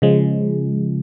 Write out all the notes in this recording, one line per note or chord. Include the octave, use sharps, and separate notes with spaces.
C#3 F3 G#3